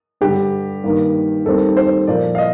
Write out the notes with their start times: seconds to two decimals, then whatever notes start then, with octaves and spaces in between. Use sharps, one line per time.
0.21 G2 D3 G3 G4
0.84 G2 D#3 A#3
1.46 D#2 D#3 G3 C4 A4
1.77 C5
2.07 A#2 F3 A#3 D5
2.35 F5
2.38 D#5